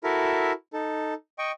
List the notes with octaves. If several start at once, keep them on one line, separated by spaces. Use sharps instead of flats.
E4 F#4 A4 A#4 E5
D#4 A4
D#5 G5 C#6